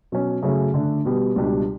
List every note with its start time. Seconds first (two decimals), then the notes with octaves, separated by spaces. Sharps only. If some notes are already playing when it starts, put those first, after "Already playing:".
0.12 B2 F#3 C#4
0.42 F#2 C#3 F#3 A3 C#4
0.74 D3 A3 D4
1.05 B2 G3 B3
1.36 C#2 B2 G3 D4